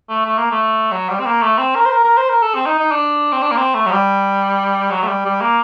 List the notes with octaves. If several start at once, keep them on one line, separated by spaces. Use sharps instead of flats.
A3
A3
A#3
A3
F#3
G3
C4
A#3
A3
C4
A#4
C5
A#4
A#4
C5
A#4
A4
C4
D#4
D#4
D4
C4
D4
A#3
C4
A3
F#3
G3
F#3
A3
G3
G3
A#3